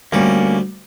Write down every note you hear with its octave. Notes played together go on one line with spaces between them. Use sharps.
D2 G3 A#3 C#4